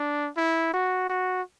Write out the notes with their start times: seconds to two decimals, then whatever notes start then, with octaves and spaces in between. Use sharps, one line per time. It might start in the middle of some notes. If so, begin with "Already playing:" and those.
Already playing: D4
0.37 E4
0.74 F#4
1.09 F#4